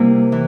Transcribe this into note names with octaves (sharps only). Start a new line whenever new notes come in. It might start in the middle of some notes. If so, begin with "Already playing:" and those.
Already playing: C3 G3 A#3 E4
E3